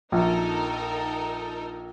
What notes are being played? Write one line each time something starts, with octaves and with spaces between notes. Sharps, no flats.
A#1 D#4 A4 A#4